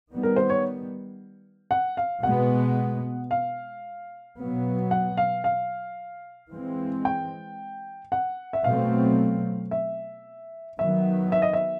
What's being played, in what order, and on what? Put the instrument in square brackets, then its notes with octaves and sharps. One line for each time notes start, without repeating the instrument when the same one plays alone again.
[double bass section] D#3 G3 B3
[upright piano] A#4
C5
C#5
F#5
F5
[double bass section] B2 G#3 B3 [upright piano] F#5
[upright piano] F5
[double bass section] B2 F#3 B3
[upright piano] F#5
F5
F5
[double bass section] E3 G#3 C4
[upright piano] G5
F#5
E5
[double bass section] B2 F#3 A3 C4 [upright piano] F5
[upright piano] E5
[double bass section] D#3 F#3 B3 [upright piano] E5
[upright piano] E5
D#5
E5